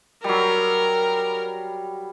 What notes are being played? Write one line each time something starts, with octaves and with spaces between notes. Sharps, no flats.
F#3 G3 A#4